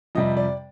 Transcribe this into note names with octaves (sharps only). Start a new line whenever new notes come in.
F2 C3 G3 D#5
D5